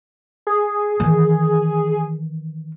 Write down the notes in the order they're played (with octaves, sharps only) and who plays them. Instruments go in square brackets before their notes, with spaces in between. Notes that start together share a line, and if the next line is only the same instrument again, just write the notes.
[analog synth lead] G#4
[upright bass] D#3 E3